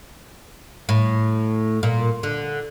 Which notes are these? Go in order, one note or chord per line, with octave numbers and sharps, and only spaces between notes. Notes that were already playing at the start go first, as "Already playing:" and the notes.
A2
A#2
D3